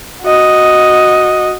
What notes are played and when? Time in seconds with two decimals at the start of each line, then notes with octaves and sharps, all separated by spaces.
0.22 F#4 D#5